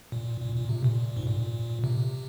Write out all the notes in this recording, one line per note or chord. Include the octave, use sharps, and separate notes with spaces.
A#2
A#2
A#2
C3
A#2
G#2
A#2
C3